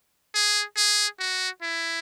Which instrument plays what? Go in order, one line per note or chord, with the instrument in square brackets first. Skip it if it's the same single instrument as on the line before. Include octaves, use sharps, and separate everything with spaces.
[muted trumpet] G#4
G#4
F#4
E4